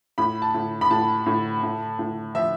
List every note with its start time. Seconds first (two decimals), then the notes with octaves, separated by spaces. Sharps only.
0.18 A2 B5
0.42 A5
0.54 A2
0.81 B5
0.90 A2 A5
1.26 A2
1.63 A2
1.99 A2
2.35 F3 E5